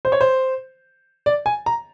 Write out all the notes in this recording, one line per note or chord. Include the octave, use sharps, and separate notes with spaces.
C5
C#5
C5
D5
G#5
A#5